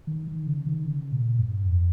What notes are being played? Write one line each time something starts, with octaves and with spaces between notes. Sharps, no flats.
D#3
D#3
C#3
D#3
C#3
A#2
G2
F2